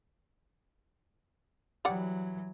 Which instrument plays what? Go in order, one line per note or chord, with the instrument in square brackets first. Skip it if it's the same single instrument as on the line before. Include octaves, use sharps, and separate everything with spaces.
[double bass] E3 F#3 [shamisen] G3 D5 F#5